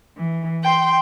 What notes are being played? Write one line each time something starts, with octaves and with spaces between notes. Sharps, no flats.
E3
G5 C6